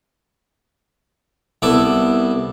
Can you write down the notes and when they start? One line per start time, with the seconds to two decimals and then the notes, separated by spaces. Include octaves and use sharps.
1.62 C2 B3 E4 A4 D6